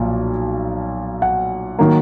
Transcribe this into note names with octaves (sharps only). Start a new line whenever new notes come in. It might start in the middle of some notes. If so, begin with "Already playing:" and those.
Already playing: B1 A#2 F3
F#5
D#3 F#3 A#3